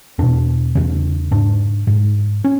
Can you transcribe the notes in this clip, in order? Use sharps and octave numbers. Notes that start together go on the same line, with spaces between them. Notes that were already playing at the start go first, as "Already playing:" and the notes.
E2 B2 D4
E2 C#3
G#2 D4
G#2
C#4